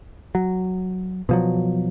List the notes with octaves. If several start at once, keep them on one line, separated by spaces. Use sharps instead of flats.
F#3
B2 F3 F#3